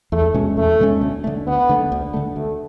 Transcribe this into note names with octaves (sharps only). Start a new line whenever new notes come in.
E2 A3
B2 G#3 C#4
E2 A3
B2 G#3 C#4
D2
D3 A3
D2 B3
D3 A3
D2
D3 A3
D2 A3